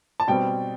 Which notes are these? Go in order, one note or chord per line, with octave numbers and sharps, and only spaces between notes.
A5
B2 G3 C4 G5